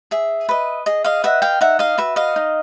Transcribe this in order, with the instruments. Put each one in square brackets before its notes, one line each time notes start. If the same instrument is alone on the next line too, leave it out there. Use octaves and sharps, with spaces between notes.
[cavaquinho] G#4 E5
B4 D#5
G#4 D#5
D#5 F5
B4 D#5 E5 F#5
F5 G5
D#4 E5 F#5
D#5 F5
F#4 B4 E5
D#5 F5
D#4